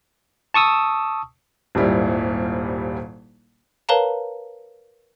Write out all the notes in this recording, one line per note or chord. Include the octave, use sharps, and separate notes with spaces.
A5 C#6 D#6 E6
D#1 G#1 A#2 G3 E4
A#4 B4 C#5 F5 A5 A#5